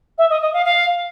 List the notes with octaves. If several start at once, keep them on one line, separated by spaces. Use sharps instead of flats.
E5
D#5
D#5
F5
F5